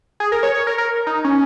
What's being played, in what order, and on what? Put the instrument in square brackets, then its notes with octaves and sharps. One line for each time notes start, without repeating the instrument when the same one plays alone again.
[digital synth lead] G#4
A#4
C#5
C#5
A#4
A#4
D#4
C#4